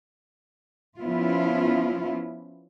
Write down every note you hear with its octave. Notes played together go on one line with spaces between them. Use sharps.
F3 B3 C#4 E4 F4